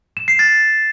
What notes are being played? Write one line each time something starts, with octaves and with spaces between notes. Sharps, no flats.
E7
C7
A6